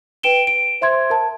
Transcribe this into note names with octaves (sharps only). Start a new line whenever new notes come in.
B4 G5 D7 E7 G7
D7
C5 E5 C6 G#6
A#4 A5